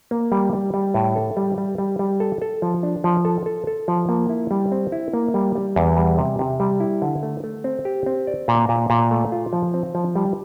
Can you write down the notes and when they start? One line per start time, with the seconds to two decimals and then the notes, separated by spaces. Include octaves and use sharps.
0.11 A#3
0.32 G3
0.53 G3
0.74 G3
0.94 A2
1.16 A4
1.37 G3
1.58 G3
1.78 G3
1.99 G3
2.20 A4
2.42 A4
2.62 F3
2.83 D4
3.04 F3
3.25 A4
3.46 A4
3.67 A4
3.88 F3
4.09 A#3
4.29 E4
4.51 G3
4.72 C4
4.92 E4
5.13 A#3
5.34 G3
5.55 G3
5.76 E2
5.97 G3
6.18 C3
6.39 C3
6.60 G3
6.80 E4
7.02 D3
7.23 A3
7.44 A3
7.64 C4
7.85 G4
8.06 C4
8.27 D5
8.48 A#2
8.69 A#2
8.90 A#2
9.11 A3
9.32 F4
9.53 F3
9.74 C4
9.95 F3
10.15 G3